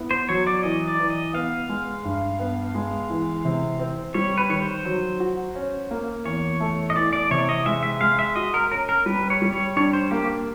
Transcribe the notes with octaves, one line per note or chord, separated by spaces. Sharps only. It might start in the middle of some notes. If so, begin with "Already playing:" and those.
Already playing: B3 E4
C5
F#3 C#5
D5
E3 D#5
D5
E3
D#5
B3 F5
G#3
G2
B3
G#3
E3
C3
C4
G3 C#5
B4
D#3 C#5
C5
F#3
F#4
C#4
A#3
E2 C#5
A3
D#5
E3 D5
D5
C3 C#5
D#5
G#3 E5
E5
G#3 F5
E5
F#4 D#5
A#4
C#4 A#4
A#4
G3 B4
C#5
G3
C#5
D4 C#5
C5
A#3 G4